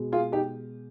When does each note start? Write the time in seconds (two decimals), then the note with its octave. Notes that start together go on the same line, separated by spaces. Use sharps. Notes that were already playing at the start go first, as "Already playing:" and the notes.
Already playing: B2 G#3
0.12 F4 G#4
0.32 D#4 G4